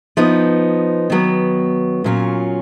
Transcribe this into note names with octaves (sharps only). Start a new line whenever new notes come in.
F3 B3 D#4
D#3 F#3 B3
A#2 F#3 C#4 F4